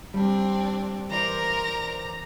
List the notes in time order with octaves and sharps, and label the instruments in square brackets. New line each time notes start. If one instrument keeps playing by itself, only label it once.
[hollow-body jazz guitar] G3 [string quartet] C4 D4
[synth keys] E3 C5 D5 [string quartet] A#4 [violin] A#5